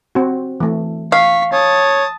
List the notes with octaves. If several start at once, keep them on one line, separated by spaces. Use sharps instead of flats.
C4 F#4
E3 A3
F5 C#6 B6
C#5 A5 D#6